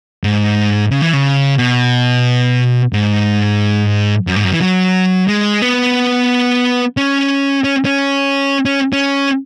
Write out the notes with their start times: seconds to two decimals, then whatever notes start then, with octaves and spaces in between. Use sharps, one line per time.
0.24 G#2
0.91 C#3
1.02 E3
1.13 C#3
1.58 B2
2.93 G#2
4.27 F#2
4.36 G#2
4.44 F#2
4.52 E3
4.61 F#3
5.28 G#3
5.62 B3
6.97 C#4
7.64 C#4
7.85 C#4
8.65 C#4
8.93 C#4